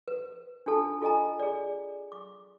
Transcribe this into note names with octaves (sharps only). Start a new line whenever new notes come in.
B4
D4 F4 A4 A5
F4 A4 D#5 G#5 A#5
G#4 D5
D6